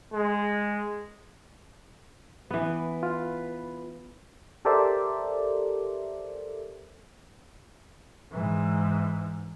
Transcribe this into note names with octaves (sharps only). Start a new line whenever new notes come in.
G#3
E3 B3 B4
F4
G4 A4 A#4 C5 D5 E5
G#2 E3